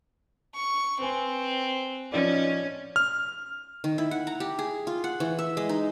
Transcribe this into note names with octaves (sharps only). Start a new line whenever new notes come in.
C#6
C4 B4 G#5 C6
F3 C#4 D#4 D5
F6
D#3
E4
F#5
A#5
G4
G#4
F4
F#5
E3
E5
G#3
D#4